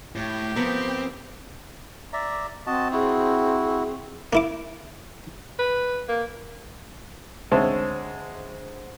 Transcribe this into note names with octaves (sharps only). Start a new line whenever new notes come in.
A2 G4
F3 B3 C4 A#4
D5 E5 A#5
C4 F#4 D#5 A5
E4 F#4 G#4
A#3 E4 D6
B4
A#3
D2 G#3 C4 C#5 E5 A5